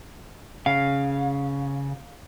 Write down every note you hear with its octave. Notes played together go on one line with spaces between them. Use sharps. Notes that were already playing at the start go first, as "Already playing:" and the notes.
C#3 F5